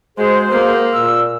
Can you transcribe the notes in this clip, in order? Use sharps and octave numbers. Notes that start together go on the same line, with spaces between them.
G#3 F#4 G#4 C5
A#3
A#2 E6